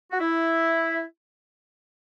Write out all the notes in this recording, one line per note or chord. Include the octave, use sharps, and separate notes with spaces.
F#4
E4